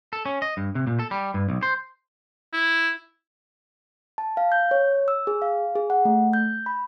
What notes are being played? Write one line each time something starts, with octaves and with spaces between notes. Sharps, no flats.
A4
C#4
D#5
G2
C3
A#2
A4
G3
G2
B1
C5
E4
A5
F5
G6
C#5
E6
G#4
F5
G#4
F#5
A3
G6
B5